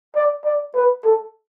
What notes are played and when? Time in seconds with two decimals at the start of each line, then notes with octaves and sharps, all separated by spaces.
0.15 D5
0.45 D5
0.75 B4
1.05 A4